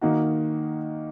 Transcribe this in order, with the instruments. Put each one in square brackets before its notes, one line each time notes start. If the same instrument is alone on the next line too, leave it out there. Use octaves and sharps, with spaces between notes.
[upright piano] D#3 A#3 D#4 F#4